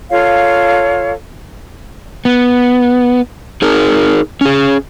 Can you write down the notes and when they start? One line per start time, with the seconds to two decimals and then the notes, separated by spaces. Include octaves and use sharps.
0.10 F4 A4 C#5 F5
2.25 B3
3.62 D#4 G#4 A#4
4.41 C#4 G#4